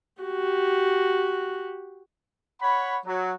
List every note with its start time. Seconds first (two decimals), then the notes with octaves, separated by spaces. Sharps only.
0.22 F#4 G4
2.61 C#5 F#5 B5
3.05 F#3